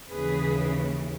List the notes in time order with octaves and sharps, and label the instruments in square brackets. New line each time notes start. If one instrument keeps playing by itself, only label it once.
[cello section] D#2 C#3 E3 G#4 B4